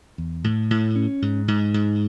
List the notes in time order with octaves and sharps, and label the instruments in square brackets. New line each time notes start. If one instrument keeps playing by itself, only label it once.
[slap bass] E2
A2
A2
C#4
G#2
G#2
G#2